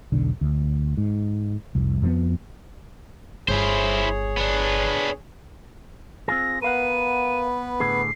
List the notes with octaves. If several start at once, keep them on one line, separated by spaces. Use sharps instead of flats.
E1 B1 D3
D2
G#2
F1 C2
F2 F3 A3 B3
G1 E4 G#4 C5 C#5
B3 D4
C4 F4 G#4 A#6
B3 A#4 B4 F5 F#5 D#7
A2 D3 G#4 C7